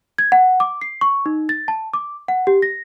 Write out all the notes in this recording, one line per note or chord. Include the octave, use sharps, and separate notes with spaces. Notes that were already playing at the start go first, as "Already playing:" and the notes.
G#6
F#5
D6
C7
C#6
D#4
A6
A5
D6
F#5
G4
A#6